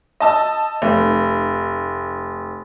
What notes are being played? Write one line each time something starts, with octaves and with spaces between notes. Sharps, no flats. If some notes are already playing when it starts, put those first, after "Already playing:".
D#5 A5 E6
F1